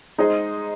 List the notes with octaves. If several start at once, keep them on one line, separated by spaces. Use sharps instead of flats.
G#3 D#4 G#4 C5 D#5